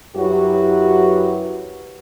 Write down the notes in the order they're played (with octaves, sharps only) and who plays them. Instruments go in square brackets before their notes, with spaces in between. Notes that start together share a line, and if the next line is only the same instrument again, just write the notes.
[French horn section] F#2 F#3 E4 F#4 G4 B4